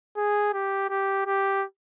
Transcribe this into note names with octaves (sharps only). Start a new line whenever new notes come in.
G#4
G4
G4
G4